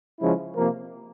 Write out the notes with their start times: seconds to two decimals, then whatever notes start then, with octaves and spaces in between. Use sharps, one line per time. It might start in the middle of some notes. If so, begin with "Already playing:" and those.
0.20 C#3 F3 G#3 C#4 E4
0.56 C3 F3 A#3